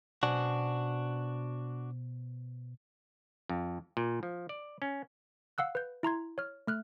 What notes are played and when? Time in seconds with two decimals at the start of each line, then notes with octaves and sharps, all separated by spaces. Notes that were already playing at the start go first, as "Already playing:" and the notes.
0.23 B2 D4 F#4 C5 G#5
3.49 F2
3.97 A#2
4.23 F3
4.49 D5
4.82 C#4
5.58 F5 F#5 E6 F#6
5.75 B4 G6
6.03 E4 A#5 C6 G#6
6.38 C#5 F6
6.67 A3 F6 F#6